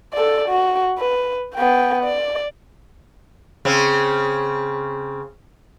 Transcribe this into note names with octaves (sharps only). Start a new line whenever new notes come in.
A4 D5
F#4
B4
B3 G5
D5
C#3 C4